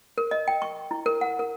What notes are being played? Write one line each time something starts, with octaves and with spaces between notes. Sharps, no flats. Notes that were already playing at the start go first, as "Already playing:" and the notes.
A#4
D#5
G5
C#6
E4
A#4
F#5
A#4